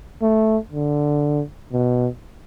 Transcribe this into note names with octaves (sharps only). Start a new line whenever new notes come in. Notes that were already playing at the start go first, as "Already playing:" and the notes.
A3
D3
B2